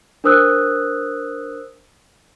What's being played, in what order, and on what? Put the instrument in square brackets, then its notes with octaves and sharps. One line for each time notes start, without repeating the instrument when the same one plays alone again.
[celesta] D4 A#4 C5 D#6 E6 F#6